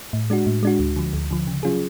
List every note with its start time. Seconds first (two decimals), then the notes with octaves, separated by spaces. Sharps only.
0.13 A2
0.30 G#3 D4 F#4
0.46 A2
0.63 G#3 D4 F#4
0.79 D2
0.96 D3 F3
1.13 D2
1.31 D3 F3
1.47 C#3
1.63 F#3 C#4 F4 G#4